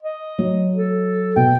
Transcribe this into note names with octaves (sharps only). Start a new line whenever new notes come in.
D#5
F#3
A4
B2 G5